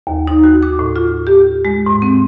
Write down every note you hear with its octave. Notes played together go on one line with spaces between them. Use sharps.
D#2
D#4
F#4
D6
A2
F4
G4
G#3
G#2
C4